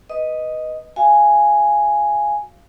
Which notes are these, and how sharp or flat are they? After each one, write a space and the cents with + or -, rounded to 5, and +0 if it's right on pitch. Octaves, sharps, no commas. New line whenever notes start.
B4 +0 D#5 +0 D#6 +0
F#4 -10 F5 -25 G#5 +0